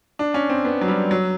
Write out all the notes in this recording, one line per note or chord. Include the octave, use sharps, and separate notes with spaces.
D4
C#4
C4
B3
F#3
G3
F#3